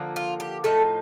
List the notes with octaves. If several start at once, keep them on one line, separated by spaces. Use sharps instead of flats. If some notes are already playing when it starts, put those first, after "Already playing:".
Already playing: D3 F3 A#3
F4
G4
A2 F3 A3 D#4 A4